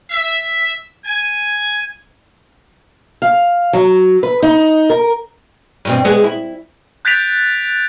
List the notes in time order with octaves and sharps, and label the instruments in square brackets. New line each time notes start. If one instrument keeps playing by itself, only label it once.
[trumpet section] E5
G#5
[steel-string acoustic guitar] F5
F#3
B4
D#4
A#4
[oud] G2 B2 C4
G#3 B3 G#4
E4
[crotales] F#6 G6 A6 B6 D7 F7